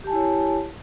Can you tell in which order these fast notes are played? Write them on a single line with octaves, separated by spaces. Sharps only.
G4 A5 G#5 E4 C#5